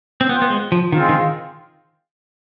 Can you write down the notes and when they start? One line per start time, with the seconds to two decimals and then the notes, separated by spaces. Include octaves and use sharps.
0.21 C4
0.28 B3 F4 C5 G5
0.42 B3
0.50 G#3
0.72 F3
0.92 D#3 G#3 C4 F4
1.09 D#3